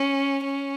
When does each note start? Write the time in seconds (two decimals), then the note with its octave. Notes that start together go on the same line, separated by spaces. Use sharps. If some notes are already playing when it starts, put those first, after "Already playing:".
Already playing: C#4
0.44 C#4